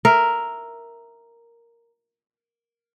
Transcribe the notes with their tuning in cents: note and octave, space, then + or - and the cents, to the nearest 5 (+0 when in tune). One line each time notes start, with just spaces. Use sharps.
A#4 +0 E5 +5